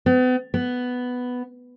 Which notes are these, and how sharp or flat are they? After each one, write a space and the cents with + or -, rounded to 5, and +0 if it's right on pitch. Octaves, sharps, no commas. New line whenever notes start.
B3 +40
B3 +5